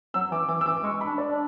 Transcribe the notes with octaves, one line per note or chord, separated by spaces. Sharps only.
F#3 E6
E3 D6
E3 D6
E6
E3 D6
G#3 C#6
B5
D4
D5
D4